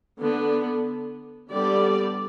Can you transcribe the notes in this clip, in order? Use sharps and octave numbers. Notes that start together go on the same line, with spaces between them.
D3 B3 D4
D3 G3 B3 G4 D5